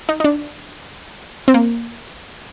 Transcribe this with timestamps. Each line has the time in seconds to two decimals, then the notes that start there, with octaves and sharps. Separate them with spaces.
0.09 D#4
0.20 D#4
0.24 D4
1.48 C4
1.54 A#3